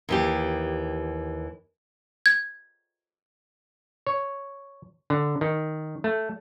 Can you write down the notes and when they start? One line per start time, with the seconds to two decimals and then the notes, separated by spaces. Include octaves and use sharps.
0.09 D#2 E3 G4
2.26 G#6
4.07 C#5
5.10 D3
5.41 D#3
6.04 A3